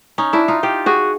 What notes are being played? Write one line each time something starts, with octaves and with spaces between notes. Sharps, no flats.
C#4 D#4
D4 E4
D#4 F4
F4 G4
F#4 G#4